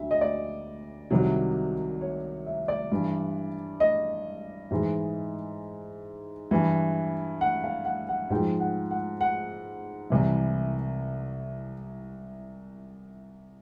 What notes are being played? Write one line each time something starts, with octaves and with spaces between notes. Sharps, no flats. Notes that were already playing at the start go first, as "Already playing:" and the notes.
Already playing: D2 D3 F#3 E5
D#5
D5
C2 C3 D#3 F#3
C#5
E5
D5
G2 E3
D#5
G#2 E3
G2 E3
F#5
F5
F#5
F#5
G#2 F3 G5
F#5
F#5
F#5
C2 C3 E3